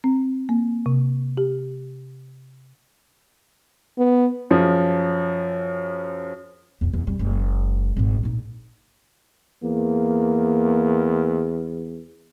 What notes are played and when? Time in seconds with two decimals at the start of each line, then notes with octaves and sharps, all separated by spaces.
0.04 C4
0.49 A#3
0.86 C3
1.37 G4
3.98 B3
4.51 F#2 F3 G#4
6.81 E2 C3
6.93 E2
7.07 F2 G3
7.19 F#1 G#3
7.96 G#1 G#2
8.23 A#1 D#4
9.63 E2 A#3